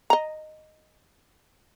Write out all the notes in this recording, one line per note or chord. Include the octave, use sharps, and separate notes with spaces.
D#5 A#5